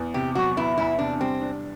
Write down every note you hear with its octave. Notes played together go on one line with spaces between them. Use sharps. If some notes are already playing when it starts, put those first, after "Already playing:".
Already playing: E2 B3
C3 G4
F#3 F#4
B3 E4
E2 E4
C3 D4
G3 C4
D4